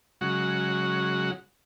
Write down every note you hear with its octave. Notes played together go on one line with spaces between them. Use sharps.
C#3 F#3 G#3 F#4